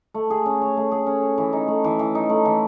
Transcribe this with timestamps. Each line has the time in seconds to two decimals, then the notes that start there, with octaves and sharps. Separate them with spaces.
0.14 A3
0.30 G#4
0.46 C#4
0.61 C#5
0.77 A3
0.92 G#4
1.06 C#4
1.22 C#5
1.38 E3
1.53 D#4
1.68 A3
1.84 E3
1.99 E3
2.15 D#4
2.30 A3
2.45 E3